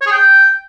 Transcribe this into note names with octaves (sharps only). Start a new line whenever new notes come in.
C#5
G#4
G5